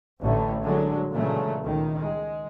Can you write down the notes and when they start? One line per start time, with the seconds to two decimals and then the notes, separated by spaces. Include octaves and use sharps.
0.21 A1 A2 D3 A3
0.63 D3 F#3 G#3
1.12 A#2 C#3 E3 F#3 G#3 A3
1.63 C#2 D#3
1.99 G#3